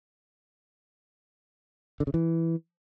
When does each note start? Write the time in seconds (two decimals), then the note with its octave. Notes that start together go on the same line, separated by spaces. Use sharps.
2.00 D3
2.07 C#3
2.14 E3